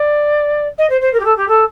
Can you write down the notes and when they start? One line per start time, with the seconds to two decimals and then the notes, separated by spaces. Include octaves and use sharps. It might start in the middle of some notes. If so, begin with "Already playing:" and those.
Already playing: D5
0.78 D#5
0.89 C5
1.01 C5
1.13 A#4
1.19 G4
1.24 A4
1.37 G4
1.48 A4